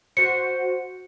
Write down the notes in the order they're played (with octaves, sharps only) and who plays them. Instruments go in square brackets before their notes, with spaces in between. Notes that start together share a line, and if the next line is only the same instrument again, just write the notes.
[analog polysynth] F#4 C5 [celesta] C#7